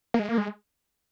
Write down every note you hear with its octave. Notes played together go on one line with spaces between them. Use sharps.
A#3
G#3
A#3
G#3